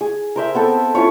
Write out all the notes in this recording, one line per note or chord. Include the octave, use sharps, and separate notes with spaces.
G#4
A#4 C5 E5
B3 C4 A4
C#4 E4 F4 C#5